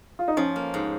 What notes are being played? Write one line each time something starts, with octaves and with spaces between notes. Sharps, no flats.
F4
D#4
F3 C#4
A#3
G#2